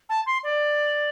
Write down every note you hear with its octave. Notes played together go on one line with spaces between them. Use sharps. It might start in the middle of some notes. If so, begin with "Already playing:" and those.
A5
C6
D5